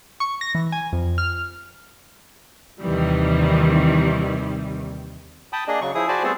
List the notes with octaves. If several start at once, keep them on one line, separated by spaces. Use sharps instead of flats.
C#6
A#6
E3
G#5
F2
F6
D#2 C3 D#3 E3 G3
G5 A5 B5 D#6
A#3 D4 G#4 D#5
C#3 F#3 C#6
F3 E4 G#4 D#6
F#4 C5 D5 G#5 A5 B5
G3 A3 B3 C4 G#4 A4